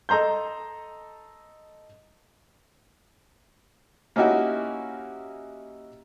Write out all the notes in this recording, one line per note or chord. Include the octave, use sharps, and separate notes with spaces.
A4 D#5 A#5 C6 G6
A#3 C#4 D#4 E4 F#4 G4